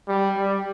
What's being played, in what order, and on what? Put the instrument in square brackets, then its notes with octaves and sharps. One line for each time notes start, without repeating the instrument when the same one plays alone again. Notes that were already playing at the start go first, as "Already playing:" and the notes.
[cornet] G3
G3